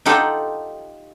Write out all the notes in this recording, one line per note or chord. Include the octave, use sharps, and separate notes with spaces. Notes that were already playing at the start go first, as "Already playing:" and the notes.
D#4 F4 G4 A4 F#5